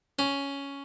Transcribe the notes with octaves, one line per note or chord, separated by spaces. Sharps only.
C#4